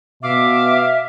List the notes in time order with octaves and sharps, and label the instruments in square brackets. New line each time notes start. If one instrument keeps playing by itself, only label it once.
[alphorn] B2 [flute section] E5 [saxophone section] F5 [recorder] D6